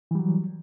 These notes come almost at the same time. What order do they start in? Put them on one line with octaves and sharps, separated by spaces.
E3 G3 F#3